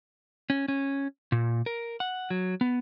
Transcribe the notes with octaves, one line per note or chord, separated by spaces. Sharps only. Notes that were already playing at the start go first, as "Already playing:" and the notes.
C#4
C#4
A#2
A#4
F#5
F#3
B3